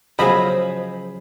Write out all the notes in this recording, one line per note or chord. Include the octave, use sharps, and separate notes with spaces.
C#3 F3 F#3 G#4 C5 D#5 B5